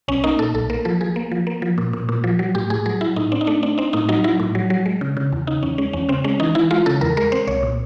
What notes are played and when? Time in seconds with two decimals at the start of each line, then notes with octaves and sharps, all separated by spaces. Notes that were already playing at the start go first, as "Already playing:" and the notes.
0.08 B1 C#4
0.24 A#3 D#4
0.39 A#2 A4
0.54 B1 A4
0.70 A#3 A#4
0.85 F3 A4
1.01 F3 G#4
1.16 A#3
1.32 F3
1.47 A#3
1.62 F3
1.78 A#2
1.93 A#2
2.09 A#2
2.24 F3
2.39 F#3
2.55 A2 G4
2.70 A2 G#4
2.86 F#3 G#4
3.01 F#3 E4
3.16 A2 D#4
3.32 C4 D4
3.41 D#4
3.47 A3 D4
3.63 C4 D4
3.78 C4 D#4
3.93 A2 D#4
4.09 F#3 D#4
4.24 F#3 E4
4.40 A2
4.55 F#3
4.70 F#3
4.86 G#3
5.01 C#3
5.17 C#3
5.32 E2
5.47 C#3 D#4
5.63 E2 C#4
5.78 G#3 C#4
5.93 E2 C#4
6.09 C#3 C4
6.24 G#3 C#4
6.40 E3 D#4
6.55 E3 E4
6.71 G#3 F4
6.86 C#3 A4
7.01 E2 A#4
7.17 G#3 A#4
7.32 C4 C5
7.47 C2 C#5
7.63 A#2